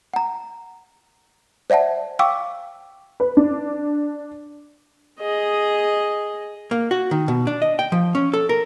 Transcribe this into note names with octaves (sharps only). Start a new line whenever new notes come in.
F#5 A#5
C5 D5 E5 F#5 A5
F5 G5 C#6 D6 E6
B4
D4
G#4 D#5
A#3
F#4
D#3
B2
D4
D#5
G5
F3
C#4
A4
A#4